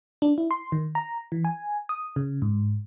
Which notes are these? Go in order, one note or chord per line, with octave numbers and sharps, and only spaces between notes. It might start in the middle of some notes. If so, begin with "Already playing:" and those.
D4
E4
C6
D#3
A#5
E3
G#5
D#6
C#3
G#2